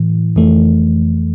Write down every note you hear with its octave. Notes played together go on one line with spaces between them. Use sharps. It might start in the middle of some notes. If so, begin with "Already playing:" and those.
Already playing: A2 E3
F2 E3 A3